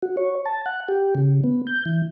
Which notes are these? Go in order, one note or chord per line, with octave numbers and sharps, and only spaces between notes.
F#4
C#5
A5
F#5
G4
C#3
B3
G6
E3